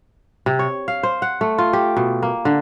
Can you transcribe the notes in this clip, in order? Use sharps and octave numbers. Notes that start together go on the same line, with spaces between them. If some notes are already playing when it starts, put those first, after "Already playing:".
C3
C#5
F5
C5
F#5
A3
F4
G4
B2
A#3
D3